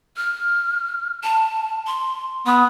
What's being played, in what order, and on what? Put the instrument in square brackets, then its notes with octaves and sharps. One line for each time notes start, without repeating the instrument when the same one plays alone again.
[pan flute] F6
A5
C6
[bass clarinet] B3 [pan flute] D#6